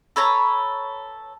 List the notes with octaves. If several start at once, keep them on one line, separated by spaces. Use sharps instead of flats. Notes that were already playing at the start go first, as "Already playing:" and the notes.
A4 B4 C#5 A#5